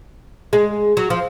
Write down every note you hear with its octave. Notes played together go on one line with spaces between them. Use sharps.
G#3
F#3
F3